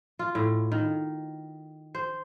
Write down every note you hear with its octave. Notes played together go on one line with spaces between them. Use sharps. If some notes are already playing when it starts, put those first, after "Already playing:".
F4
A2
D#3
C5